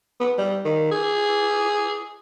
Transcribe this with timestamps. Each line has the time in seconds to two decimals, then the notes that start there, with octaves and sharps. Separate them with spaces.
0.20 B3
0.38 G3
0.65 D#3
0.91 G#4